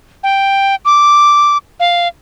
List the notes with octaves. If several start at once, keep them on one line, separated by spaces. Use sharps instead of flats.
G5
D6
F5